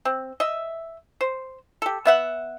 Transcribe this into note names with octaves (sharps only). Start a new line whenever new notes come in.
C4
D#5 E5
C5
G4 A4
B3 E5 F#5